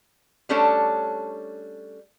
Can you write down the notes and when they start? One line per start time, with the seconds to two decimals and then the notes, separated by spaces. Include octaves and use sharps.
0.49 G3 A3 C#4 D4 A4 C#5